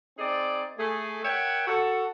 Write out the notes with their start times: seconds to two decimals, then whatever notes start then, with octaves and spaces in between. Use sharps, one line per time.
0.18 C4 D#4 G#4 D5
0.78 A3 G#4
1.24 A#4 C#5 E5 F#5 G5
1.67 F#4 A4